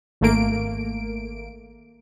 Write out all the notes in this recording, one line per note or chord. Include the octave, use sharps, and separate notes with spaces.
G#1 A3 A#3 D7